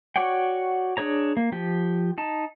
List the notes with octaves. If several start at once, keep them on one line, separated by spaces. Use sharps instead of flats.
F#4 C#5 D5 F#5 G5
D4 G#4 C#5 A#5
A#3
F3 G4
D#4 A5